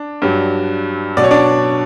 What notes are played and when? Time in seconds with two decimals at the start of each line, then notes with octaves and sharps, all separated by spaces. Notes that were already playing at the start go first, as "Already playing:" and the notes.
Already playing: D4
0.22 G2 F#3
1.17 B2 F#3 D5
1.24 C#5
1.31 D4 D5